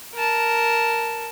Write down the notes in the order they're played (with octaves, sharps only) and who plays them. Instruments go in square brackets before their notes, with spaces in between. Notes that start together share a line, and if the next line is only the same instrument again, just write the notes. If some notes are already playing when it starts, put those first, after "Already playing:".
[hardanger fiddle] A#4 A5